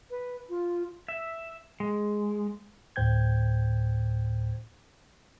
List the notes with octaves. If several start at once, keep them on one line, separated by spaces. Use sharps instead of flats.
B4
F4
E5
G#3
D2 A2 C5 G5 G6 G#6